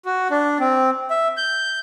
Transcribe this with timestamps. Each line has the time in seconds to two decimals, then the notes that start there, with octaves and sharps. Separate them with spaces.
0.05 F#4
0.31 D4
0.60 C4
1.10 E5
1.37 G6